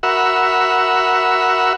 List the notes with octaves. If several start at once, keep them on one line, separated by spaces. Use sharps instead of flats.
F#4 A#4 E5 F#5 B5 E6